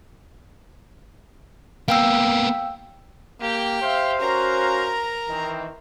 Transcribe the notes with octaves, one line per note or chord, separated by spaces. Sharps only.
A#3 B3 F5 G5 E6
A#3 G4 G5
C5 E5 F5
C#4 F#4 A#4 F5 A#5
D#3 E3 C4